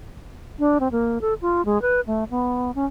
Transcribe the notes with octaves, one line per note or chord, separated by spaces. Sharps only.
D4
C4
A#3
A4
F4
G#3
B4
A3
B3
C#4